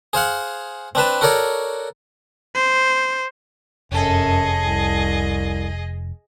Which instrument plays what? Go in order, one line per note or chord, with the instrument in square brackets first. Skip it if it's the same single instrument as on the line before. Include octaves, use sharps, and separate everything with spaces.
[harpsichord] G#4 C5 F5 F#5
C4 D4 B4 A5
F#4 A4 A#4 C#5 D5
[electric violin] C5
[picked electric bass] F1 [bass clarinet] F#2 [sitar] C#4 A4 [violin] G#4 D#5
[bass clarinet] C2